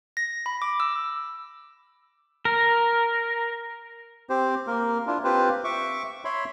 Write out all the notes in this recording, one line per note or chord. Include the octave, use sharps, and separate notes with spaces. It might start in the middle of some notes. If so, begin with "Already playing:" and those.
A#6
B5
D6
E6
A#4
C4 G4 C5
A#3 A#4
D4 E4 F4
C4 F4 G4 B4 C5
E5 C#6 D6
C#5 E5 B5 C6